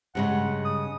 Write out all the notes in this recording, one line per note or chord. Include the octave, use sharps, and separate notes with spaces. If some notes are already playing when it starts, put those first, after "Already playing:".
G2 C#3 G#3 F#5
D#6